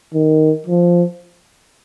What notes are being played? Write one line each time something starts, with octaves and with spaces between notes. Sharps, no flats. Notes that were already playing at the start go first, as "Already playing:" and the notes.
D#3
F3